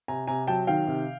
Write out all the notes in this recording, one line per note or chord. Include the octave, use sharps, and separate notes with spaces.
C3 G#5 A#5
C3 G#5 A#5
F#3 G5 A5
D#3 F5 G5
C3